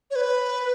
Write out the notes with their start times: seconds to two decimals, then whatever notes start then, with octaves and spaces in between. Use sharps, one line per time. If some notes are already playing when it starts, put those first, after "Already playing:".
0.11 C#5
0.16 B4